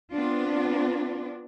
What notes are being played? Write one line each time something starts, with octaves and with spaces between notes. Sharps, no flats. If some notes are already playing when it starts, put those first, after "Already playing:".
B3 C4 D4 F4